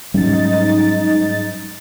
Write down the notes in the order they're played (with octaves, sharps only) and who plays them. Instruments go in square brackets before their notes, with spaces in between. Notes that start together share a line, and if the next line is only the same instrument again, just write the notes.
[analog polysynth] G#2 D#4 A6 [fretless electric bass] F#3 G3 C#4